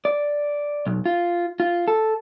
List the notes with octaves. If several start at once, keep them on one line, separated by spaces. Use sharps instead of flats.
D5
B1
F4
F4
A4